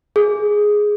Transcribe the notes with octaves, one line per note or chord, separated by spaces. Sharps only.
G#4